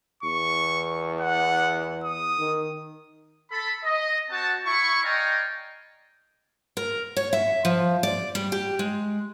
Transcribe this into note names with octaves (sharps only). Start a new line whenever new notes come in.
E2 C#6
F#5
D#6
D#3
A4 B5
D#5
C4 F#4 F#5 A5
E4 C#6
D5 D#5 F5 G5 G#5 A#5
A#4
C#5
E5
F3
D5
G3
G4
G#3